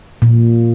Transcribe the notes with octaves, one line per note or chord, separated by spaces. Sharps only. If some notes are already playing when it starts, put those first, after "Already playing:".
A#2